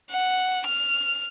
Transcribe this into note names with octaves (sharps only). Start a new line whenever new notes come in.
F#5
F6